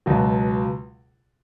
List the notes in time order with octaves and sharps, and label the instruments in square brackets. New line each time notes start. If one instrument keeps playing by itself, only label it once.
[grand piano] C#2 B2 F#3